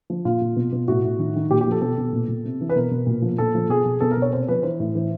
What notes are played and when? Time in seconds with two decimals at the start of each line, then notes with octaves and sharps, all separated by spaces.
0.10 F3
0.25 A#2 F4
0.41 A#2
0.56 B2
0.72 B2
0.88 A2 F#4
1.04 A2
1.19 D#3
1.36 D#3
1.51 A#2 G4
1.61 G4
1.67 F3 A4
1.81 B2 A4
1.98 B2
2.13 A#2
2.28 A#2
2.45 C3
2.61 E3
2.69 B4
2.76 B2 A#4
2.91 B2
3.06 A#2
3.22 F3
3.38 A#2 A4
3.55 F3
3.69 B2 G#4
3.85 B2
4.01 B2 A4
4.11 A#4
4.17 B2
4.22 C#5
4.32 C3 C5
4.48 F3 B4
4.63 E3 C5
4.80 A2
4.95 E3